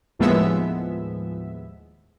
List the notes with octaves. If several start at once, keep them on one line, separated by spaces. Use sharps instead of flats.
D#2 A2 F3 G#3 B3 E5